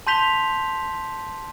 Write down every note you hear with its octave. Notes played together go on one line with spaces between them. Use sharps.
A5 C6 G6 B6 F7 G7